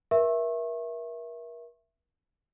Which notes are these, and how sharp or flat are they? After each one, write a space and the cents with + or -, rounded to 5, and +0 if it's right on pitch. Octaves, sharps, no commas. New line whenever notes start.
A#4 +35 E5 +0 C#6 -35